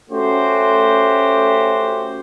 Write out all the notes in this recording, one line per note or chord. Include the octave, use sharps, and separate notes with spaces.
A3 C#4 F#4 G4 C5